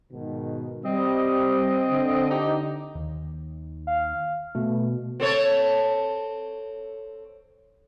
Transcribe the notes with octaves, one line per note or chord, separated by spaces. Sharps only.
G#2 B2 D#3
G3 C4 D#5
D3
D#4 G4
D#2
F5
B2 A3
C4 A4 C#5